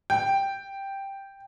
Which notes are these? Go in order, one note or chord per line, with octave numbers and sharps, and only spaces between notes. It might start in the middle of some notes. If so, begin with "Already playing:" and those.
G5